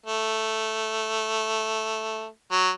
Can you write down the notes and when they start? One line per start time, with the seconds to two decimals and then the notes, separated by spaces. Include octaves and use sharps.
0.06 A3
2.51 F#3